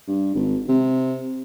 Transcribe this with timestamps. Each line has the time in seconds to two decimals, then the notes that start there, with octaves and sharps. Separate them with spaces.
0.08 G2
0.35 G#1
0.68 C3